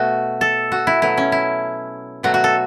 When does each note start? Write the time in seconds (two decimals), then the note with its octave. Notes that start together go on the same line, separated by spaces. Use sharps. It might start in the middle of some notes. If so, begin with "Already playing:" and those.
Already playing: B2 A3 F#4
0.41 A4
0.72 F#4
0.87 E4
1.02 B2 F#3 A3 E4
1.17 C#4
1.32 E4
2.23 B2 F#3 A3 F#4
2.34 F#4
2.44 A4